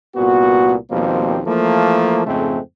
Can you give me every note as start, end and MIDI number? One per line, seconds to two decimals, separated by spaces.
0.16 0.75 36
0.16 0.75 46
0.16 0.75 59
0.16 0.75 66
0.90 1.40 39
0.90 1.40 47
0.90 1.40 53
0.90 1.40 55
0.90 1.40 58
0.90 1.40 60
1.45 2.25 52
1.45 2.25 53
1.45 2.25 57
1.45 2.25 58
2.25 2.58 41
2.25 2.58 44
2.25 2.58 49
2.25 2.58 56
2.25 2.58 57
2.25 2.58 60